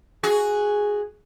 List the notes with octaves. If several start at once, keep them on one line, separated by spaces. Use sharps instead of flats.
F#4 G#4